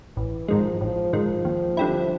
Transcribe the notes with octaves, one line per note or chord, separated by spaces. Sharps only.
A1 E3
G#2 D#3 F3 G#3
A1 F3
G#2 D#3 F3 G#3
D#2
D3 G3 C4 E4